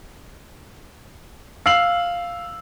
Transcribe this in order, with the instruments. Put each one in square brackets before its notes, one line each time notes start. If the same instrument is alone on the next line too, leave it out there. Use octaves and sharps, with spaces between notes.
[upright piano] F5 E6 C7 F#7